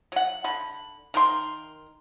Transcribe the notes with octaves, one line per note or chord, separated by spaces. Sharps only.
F#3 F#5
D3 B5
D#3 A#4 C6